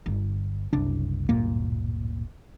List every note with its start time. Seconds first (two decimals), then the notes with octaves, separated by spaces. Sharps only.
0.06 G1
0.73 F#1 C2 D4
1.29 D1 G1 A#2 A#3